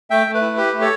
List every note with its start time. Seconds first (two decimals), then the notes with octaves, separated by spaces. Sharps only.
0.10 A3 E5 G5
0.27 A3
0.34 B4
0.42 E4
0.57 G4 B4
0.73 A3
0.81 A4 C#5